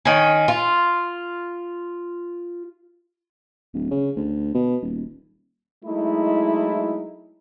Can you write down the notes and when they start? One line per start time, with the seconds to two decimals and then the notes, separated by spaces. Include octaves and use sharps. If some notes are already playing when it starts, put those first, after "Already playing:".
0.05 D#3 C#4
0.48 F4
3.74 D1
3.91 C#3
4.16 D2
4.54 B2
4.82 D#1
5.85 F#3 G#3 A3 D#4 E4